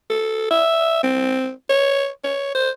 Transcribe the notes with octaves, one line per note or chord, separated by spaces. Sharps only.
A4
E5
C4
C#5
C#5
C5